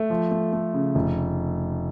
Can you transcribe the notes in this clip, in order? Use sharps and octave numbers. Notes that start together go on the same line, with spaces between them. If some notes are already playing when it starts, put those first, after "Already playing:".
Already playing: A3
F3
A3
A3
C#3
F1